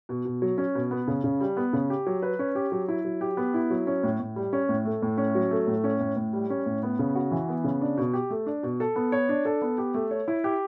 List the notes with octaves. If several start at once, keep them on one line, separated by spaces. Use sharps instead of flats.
B2
B2
F#3
C#4
B2
B3
C#3
C#3
G3
B3
C#3
G4
F#3
B4
C#4
G4
F#3
E4
F#3
G4
B3
E4
F#3
C#4
A2
A2
G3
C#4
A2
A3
A2
C#4
F#3
A3
A2
C#4
A2
A2
G3
C#4
A2
B3
C#3
F#4
E3
B3
C#3
D4
B2
G4
A3
D4
B2
A4
B3
C#5
D4
A4
B3
G4
A3
C#5
E4
G4